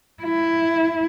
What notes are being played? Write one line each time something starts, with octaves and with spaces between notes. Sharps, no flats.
E4